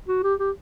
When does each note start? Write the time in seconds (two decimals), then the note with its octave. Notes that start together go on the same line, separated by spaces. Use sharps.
0.08 F#4
0.23 G4
0.40 G4